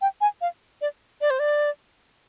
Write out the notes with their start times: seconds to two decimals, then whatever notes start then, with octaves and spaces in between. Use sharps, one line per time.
0.01 G5
0.21 G#5
0.41 F5
0.81 D5
1.21 D5
1.30 C5
1.39 D5